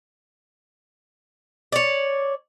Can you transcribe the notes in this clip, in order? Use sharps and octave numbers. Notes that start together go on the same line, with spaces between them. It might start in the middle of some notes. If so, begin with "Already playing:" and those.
C#5 D5